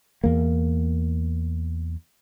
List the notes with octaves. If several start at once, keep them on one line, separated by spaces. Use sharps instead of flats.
E2 A#3